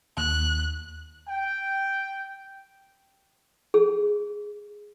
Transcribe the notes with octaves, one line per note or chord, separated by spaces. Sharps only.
D#2 F#6
G5
G#4